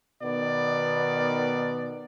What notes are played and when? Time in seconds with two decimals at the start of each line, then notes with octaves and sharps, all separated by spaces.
0.22 B2 D#3 B3 D5